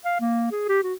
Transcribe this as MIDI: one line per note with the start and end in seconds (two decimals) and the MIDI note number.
0.05 0.16 77
0.20 0.51 58
0.52 0.67 68
0.69 0.81 67
0.83 0.94 66